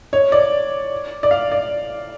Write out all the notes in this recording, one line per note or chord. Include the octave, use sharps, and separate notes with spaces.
C#5
D5
D5
F5
D5